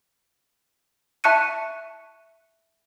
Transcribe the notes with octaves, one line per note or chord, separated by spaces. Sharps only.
E5 A5 C#6 F#6 C#7 D#7